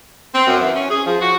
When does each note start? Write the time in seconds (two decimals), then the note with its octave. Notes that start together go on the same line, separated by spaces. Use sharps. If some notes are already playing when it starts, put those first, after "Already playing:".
0.33 C4
0.47 F#2
0.59 E3
0.74 C#4
0.89 G#4
1.05 F3
1.20 F#4